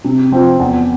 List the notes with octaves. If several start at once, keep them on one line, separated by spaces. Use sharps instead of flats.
C3
F3 C4 F4
E2